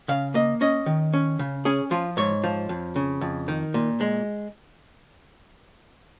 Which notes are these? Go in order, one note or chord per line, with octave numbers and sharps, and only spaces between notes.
C#3 F5
A#3 D#5
C#4 D#5
D#3
C#4
C#3
C#4 G#4
F3 F4
G#2 C#5
F3
F2
C#3
F2
D#3
A#2
G#3